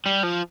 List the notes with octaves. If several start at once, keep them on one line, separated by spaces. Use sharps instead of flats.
G3
F3